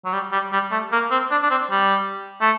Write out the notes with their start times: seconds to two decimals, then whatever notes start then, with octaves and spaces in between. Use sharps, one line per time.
0.05 F#3
0.13 G3
0.32 G3
0.53 G3
0.71 A3
0.92 A#3
1.11 C4
1.31 D4
1.42 D4
1.50 C4
1.71 G3
2.41 A3